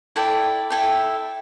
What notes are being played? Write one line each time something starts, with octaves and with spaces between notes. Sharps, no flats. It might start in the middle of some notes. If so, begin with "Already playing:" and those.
E4 A4 D5 G5
E4 A4 E5 G5